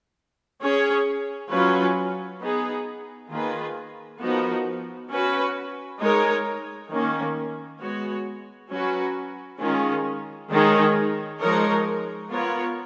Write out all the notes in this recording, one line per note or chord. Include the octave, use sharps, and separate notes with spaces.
C#4 G#4 C#5
F#3 C#4 F4 B4
B3 D#4 G#4 B4
D#3 A#3 F4 G#4 B4
F3 B3 D#4 F#4 A#4
C#4 F#4 B4
G#3 D#4 A#4 C#5
D#3 A#3 C#4
G#3 B3 F#4 C#5
F#3 C#4 F#4 B4
D#3 G#3 C#4 F4
D#3 G#3 D#4 G#4 C#5
F3 G#3 D#4 A#4 C#5
B3 F4 A#4 C#5